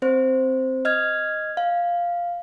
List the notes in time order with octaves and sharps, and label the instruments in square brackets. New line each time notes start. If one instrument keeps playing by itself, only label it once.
[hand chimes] C4 C5
D#5 F6 G#6
F5